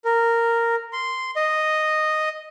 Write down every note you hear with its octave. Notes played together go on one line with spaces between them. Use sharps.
A#4
C6
D#5